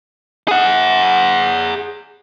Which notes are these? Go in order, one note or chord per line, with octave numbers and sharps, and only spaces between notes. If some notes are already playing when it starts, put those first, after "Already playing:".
G#4 F#5